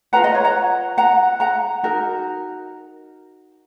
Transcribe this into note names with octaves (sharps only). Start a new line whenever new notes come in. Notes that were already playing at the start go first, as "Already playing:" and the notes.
F4 B4 F#5 A#5
D#5 F#5
C#5
F#5 A#5
F#5 A#5
F#5 A#5
D#4 F#4 A#4